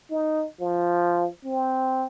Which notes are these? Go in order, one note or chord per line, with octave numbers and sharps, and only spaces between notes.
D#4
F3
C4